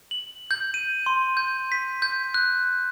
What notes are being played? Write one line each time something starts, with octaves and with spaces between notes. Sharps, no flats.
F#7
G6
D#7
C6
G6
B6
G6
F#6